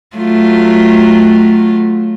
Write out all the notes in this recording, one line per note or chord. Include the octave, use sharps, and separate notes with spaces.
F#3 A3 F4